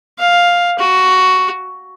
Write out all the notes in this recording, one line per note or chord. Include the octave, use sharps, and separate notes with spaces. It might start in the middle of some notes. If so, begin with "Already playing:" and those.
F5
F#4